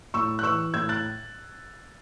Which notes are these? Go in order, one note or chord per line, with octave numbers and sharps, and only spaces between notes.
A2 C#6 E6
F#6
E3 C#6 E6
A2 E6 G#6
F#6 A6